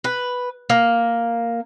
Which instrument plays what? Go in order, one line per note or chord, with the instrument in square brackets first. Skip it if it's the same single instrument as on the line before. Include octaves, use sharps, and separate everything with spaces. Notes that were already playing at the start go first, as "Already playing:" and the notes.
[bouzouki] B4
A#3